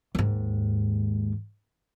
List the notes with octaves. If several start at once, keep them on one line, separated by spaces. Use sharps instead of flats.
D#2 G#2